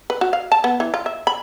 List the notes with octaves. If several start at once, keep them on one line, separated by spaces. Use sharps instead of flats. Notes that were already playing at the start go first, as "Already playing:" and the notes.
B4
F#4
F5
A5
B3
E3
F4
E5
B5